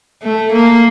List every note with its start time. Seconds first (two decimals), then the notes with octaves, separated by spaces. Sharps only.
0.23 A3
0.52 A#3